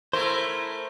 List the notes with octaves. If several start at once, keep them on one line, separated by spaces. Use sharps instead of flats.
A3 E4 A#4 C5